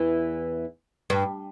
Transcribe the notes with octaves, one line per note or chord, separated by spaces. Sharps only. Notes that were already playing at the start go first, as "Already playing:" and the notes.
Already playing: E2 E3
G2